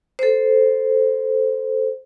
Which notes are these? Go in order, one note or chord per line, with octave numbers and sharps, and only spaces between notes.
A4 C5